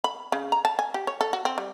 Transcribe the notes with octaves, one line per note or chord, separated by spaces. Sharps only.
B5
C#3
A#5
A5
G#5
G4
C#5
A4
F#4
C4
G3